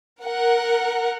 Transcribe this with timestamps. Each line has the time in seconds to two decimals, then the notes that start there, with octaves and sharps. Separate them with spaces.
0.23 A#4 F#5